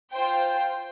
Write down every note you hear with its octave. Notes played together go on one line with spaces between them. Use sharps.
F4 C5 G5